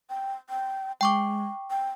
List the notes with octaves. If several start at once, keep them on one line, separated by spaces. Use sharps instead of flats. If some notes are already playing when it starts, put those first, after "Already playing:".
G5
G5
G#3 G5 C#6 D6
G5